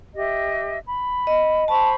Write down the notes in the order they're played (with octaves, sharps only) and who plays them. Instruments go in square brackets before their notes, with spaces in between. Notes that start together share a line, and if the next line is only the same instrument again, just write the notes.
[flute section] G4 D#5 E5
B5
[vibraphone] D#5
[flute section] C5 B5 C#6 [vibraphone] A5